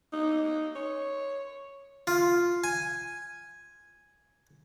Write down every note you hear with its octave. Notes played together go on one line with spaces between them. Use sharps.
D#4
C#5
F4
G#5